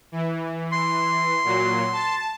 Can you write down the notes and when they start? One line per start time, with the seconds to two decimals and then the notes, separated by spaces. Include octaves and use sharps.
0.12 E3
0.72 C6
1.44 A#2 F#3
1.93 A5